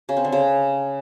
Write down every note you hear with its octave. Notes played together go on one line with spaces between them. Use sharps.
C#3
C4
D3
C#3